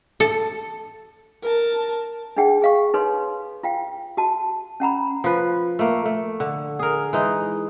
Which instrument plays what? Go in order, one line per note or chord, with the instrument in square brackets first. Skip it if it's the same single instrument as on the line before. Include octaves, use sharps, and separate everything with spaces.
[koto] A4
[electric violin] A#4 A5
[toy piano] D4 D#4 G#4 F#5 G5
G#4 F5 C#6
D#4 A4 B4 C#5 C6
F4 F5 G5
F#4 A5
C#4 F#5 A#5 B5
[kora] F3 B4
A3 A#3
A3
D3
G#4 A#4
E3 G#3 D#4